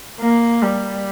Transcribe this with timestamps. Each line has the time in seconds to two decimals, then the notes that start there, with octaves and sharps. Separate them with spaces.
0.20 A#3
0.63 G3